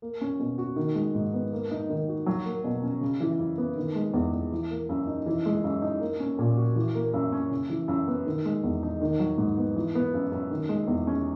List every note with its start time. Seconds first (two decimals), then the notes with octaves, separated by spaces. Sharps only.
0.02 A#3
0.21 C#4
0.39 B2
0.58 F#4
0.76 D#3
0.95 G#3
1.15 G#2
1.34 B3
1.52 A#3
1.71 D#4
1.90 D#3
2.08 F#4
2.26 F#3
2.46 A#3
2.64 B2
2.83 C#4
3.01 C#3
3.20 E3
3.39 F#2
3.58 B3
3.77 D#3
3.95 G#3
4.14 E2
4.33 E2
4.52 E3
4.71 A#3
4.89 F#2
5.07 D#4
5.26 E3
5.46 G#3
5.64 F#2
5.82 D#4
6.01 A#3
6.20 C#4
6.39 A#2
6.57 F#4
6.76 E3
6.95 A#3
7.14 F#2
7.32 C#4
7.51 C#3
7.70 E3
7.88 F#2
8.08 B3
8.27 D#3
8.45 G#3
8.64 E2
8.83 D#4
9.02 D#3
9.19 F#3
9.38 G#2
9.57 B3
9.76 E3
9.95 B3
10.14 F#2
10.32 F#2
10.51 D#3
10.69 G#3
10.88 E2
11.07 C#4